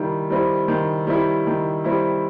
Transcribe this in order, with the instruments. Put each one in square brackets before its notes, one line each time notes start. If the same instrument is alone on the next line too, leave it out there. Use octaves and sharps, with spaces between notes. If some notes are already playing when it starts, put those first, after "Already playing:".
Already playing: [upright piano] D#3 G3 E4
G3 C4 E4
D#3
G3 C4 E4
D#3
G3 C4 E4